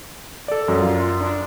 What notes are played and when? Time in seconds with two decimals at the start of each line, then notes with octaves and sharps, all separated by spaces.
0.48 A4 D5
0.68 F#2 F#3
0.82 F4
1.21 D4